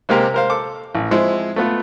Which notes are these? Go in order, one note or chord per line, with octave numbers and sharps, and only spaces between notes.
C3 G#3 A#3 G4 A#4
A#4 C5 F5
A4 D6
A1
F3 G#3 C4 E4
A3 B3 F4